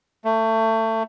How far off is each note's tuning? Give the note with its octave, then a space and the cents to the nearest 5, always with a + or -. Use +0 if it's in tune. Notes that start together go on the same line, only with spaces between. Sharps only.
A3 +25